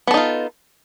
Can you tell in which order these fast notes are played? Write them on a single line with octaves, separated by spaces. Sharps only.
B3 A4 D#4 F4